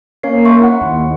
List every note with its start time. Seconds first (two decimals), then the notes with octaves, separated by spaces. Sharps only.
0.23 A#3 C#4 C#5 C7
0.45 E5 C6 C#6
0.61 E4 F#5
0.82 D#2